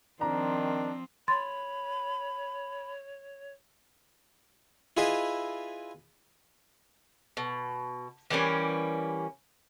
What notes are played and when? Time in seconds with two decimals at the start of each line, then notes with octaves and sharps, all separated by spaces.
0.21 D#3 F3 C4 D4 A#5
1.28 C#5 B5 C6 A6
4.97 E4 F4 G#4 B4 D#5 E5
7.37 B2
8.30 E3 G3 A#3 C#4